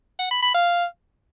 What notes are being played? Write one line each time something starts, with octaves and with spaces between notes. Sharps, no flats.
F#5
B5
B5
F5